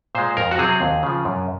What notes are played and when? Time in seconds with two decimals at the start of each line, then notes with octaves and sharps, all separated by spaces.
0.15 A#2 G#3 C5
0.37 F2 A#4
0.51 F#4
0.58 C3 F#3 C4 G#4
0.81 D#2
1.03 C#3 F3
1.25 F#2